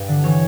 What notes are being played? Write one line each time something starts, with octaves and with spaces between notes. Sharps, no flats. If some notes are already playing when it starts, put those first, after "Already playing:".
Already playing: G2
D3
E3 C#5